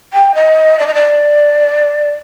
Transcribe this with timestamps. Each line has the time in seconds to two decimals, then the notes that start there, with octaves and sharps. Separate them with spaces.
0.13 G5
0.35 D#5
0.79 D5
0.87 D#5
0.94 D5